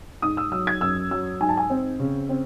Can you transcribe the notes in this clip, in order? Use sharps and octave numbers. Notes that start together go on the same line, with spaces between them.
G#2 D#6
E6
F#3 E6
G#6
F#2 E6
F#3 E6
G#2 G#5
A5
G#5
C4
C#3
C4